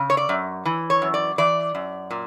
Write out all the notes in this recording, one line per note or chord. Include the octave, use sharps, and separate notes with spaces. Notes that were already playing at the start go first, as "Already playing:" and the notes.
Already playing: C#3
C#5
D5
F#2
E3
C#5
F#2
D5
E3 D5
F#2
A#2